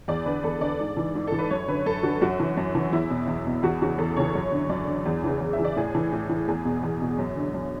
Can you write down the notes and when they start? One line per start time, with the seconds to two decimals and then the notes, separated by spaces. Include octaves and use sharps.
0.08 E2 D5
0.26 D3 B4
0.44 E2 A4
0.61 D3 D5
0.80 G#2
0.97 E3
1.15 G#2
1.27 E3 A4
1.38 B4
1.51 F#2 C#5
1.68 D3 B4
1.86 F#2 A4
2.03 D3 F#4
2.22 F#2 F#4
2.40 E3
2.57 F#2
2.75 E3
2.92 E2 E4
3.10 B2
3.28 E2
3.46 B2
3.63 E2 F#4
3.82 C#3 E3 F#4
3.98 E2 A4
4.16 C#3 E3 C#5
4.35 F#2
4.52 D3
4.69 F#2 D5
4.87 D3
5.06 E2
5.24 C#3 E3
5.41 E2
5.53 E5
5.58 C#3 E3
5.64 D5
5.76 A2 G#4
5.95 E3
6.12 A2
6.29 E3
6.48 E2 G#4
6.65 B2
6.83 E2
7.02 B2
7.18 F#2
7.36 D3
7.54 F#2